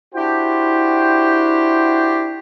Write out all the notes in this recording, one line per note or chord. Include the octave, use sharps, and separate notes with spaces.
D4 E4 F#4 G4 C5 G5